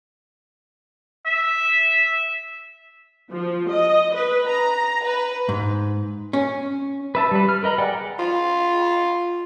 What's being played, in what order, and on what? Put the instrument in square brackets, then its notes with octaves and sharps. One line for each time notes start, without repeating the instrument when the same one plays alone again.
[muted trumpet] E5
[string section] F3
D#5
B4
A#5
B4
[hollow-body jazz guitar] G#2
C#4
[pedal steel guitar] B4 E5 A5
G3 B4
F6
A#4 B4 D#5 A#5 B5
G#4 D5 F#5 G5
[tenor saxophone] F4